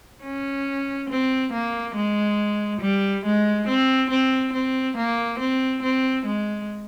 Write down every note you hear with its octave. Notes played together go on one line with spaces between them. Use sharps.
C#4
C4
A#3
G#3
G3
G#3
C4
C4
C4
A#3
C4
C4
G#3